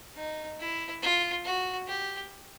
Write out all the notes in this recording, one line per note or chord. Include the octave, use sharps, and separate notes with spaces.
D#4
E4
F4
F#4
G4